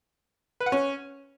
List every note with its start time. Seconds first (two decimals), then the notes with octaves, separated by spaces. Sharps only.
0.60 B4
0.66 F#5
0.72 C#4